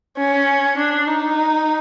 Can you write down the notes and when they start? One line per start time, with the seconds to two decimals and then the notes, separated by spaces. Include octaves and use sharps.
0.18 C#4
0.77 D4
1.07 D#4